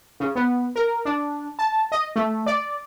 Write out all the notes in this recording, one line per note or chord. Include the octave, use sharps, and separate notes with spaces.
C#3
B3
A#4
D4
A5
D#5
A3
D5